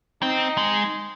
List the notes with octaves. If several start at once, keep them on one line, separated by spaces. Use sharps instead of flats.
C4 D#4
G#3